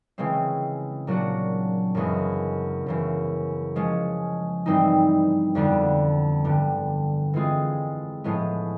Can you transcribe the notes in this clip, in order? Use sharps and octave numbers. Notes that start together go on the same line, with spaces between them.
C#3 E3 G#3 C4
A#2 F#3 A#3 D4 F#4
F#2 C#3 E3 G#3 B3
F#2 C#3 E3
F3 G#3 C#4
G2 E3 G3 C4 D#4
F2 D3 G3 B3 D4
G2 D3 G3
E3 G#3 C4 F4 G#4
A2 F3 G#3 B3